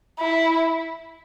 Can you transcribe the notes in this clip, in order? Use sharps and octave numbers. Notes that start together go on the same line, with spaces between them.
E4